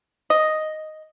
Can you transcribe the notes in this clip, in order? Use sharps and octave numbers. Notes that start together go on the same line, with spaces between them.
D#5